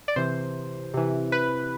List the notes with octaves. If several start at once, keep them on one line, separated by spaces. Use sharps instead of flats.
D5
C3 E3 C5
C3 E3
B4